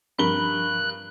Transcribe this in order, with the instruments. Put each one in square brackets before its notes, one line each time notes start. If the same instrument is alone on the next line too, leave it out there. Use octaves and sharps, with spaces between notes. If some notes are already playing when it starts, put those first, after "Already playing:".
[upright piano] G2 A#4 G7 [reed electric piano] F3 B5 [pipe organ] F#6